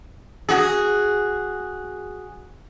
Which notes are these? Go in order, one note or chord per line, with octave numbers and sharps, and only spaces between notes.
F#4 G#4